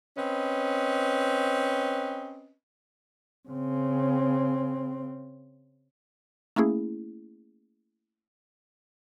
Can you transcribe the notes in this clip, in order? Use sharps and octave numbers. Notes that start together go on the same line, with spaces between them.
C4 C#4 B4 D#5
C#3 C4
A3 A#3 C#4 E4 G#4